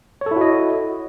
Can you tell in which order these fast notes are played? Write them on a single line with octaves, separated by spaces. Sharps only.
C#5 A4 E4 F#4 D#5